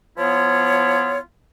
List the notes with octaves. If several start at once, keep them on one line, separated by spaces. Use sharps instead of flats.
F3 B3 E4 F4 C#5